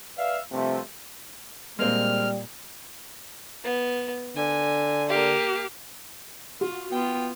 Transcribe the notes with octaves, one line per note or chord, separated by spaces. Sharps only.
B4 D5 E5 F5
G2 C3 F3 A3
A#2 G3 G#3 A#3 C4 F6
B3
D3 G#5
A#3 G4 F5
F4 F#4
B3 F4 G5